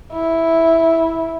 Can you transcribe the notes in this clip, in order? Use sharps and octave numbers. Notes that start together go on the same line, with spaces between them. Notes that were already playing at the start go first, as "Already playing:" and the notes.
E4